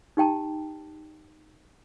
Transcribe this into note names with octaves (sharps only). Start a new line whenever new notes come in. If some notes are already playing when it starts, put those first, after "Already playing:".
D#4 G4 G5 A5 A#5